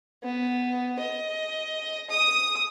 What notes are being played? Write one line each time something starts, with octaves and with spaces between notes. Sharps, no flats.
B3
D#5
D#6